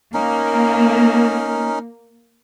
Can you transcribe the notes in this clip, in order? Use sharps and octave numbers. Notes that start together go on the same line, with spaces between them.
A#3 C#4 D#4 A#4